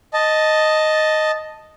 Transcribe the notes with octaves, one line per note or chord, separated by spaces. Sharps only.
D#5 A5